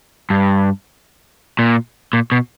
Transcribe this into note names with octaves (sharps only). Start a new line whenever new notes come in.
G2
A#2
A#2
B2